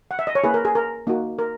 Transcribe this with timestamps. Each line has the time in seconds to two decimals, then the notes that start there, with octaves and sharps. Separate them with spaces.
0.11 F#5
0.19 E5
0.27 D#5
0.35 C#5
0.44 A#3 E4 G#4 B4
0.54 A#4
0.65 G#4
0.75 A#4
1.07 A#3 D#4 F#4
1.39 A#4